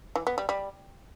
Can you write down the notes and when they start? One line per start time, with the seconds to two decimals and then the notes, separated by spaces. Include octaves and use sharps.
0.16 E3
0.27 B3
0.38 G3
0.49 G3